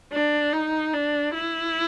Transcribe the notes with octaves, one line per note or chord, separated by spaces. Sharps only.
D4
D#4
D4
E4